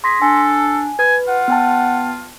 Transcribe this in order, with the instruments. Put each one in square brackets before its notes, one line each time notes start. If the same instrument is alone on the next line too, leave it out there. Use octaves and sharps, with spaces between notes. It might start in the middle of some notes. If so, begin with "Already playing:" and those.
[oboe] G#4 [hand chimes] C6 A#6 B6
[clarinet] D4 [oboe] A4 [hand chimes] G#5
[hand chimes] B4 [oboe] G#5
[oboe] F4 [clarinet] F#5
[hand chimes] B3 G5 A5